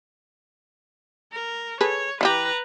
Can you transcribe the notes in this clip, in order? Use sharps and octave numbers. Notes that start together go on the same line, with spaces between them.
A#4
G#4 A4 B4 C#5
E3 D#4 G4 B4 A#5